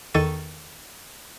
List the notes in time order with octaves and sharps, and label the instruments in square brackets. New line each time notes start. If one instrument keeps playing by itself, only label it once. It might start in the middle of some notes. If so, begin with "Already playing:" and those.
[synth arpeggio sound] E2 D#3 A4 C#6 A6 D#7